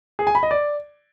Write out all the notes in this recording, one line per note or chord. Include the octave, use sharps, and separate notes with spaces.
G#4
G#5
B5
D#5
D5